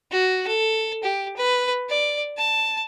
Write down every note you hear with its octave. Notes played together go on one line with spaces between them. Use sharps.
F#4
A4
G4
B4
D5
A5